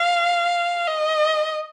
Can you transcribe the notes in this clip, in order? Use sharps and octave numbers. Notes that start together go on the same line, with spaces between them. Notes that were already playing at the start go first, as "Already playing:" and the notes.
Already playing: F5
D#5